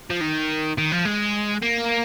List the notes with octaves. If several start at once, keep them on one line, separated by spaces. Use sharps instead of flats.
F3
D#3
D#3
F3
G#3
A#3